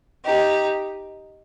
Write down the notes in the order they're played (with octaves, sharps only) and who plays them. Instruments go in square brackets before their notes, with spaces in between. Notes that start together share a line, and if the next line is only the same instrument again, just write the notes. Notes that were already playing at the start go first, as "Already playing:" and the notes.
[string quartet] D#4 G4